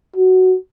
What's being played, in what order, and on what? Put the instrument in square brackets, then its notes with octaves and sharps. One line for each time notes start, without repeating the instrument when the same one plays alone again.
[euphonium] F#4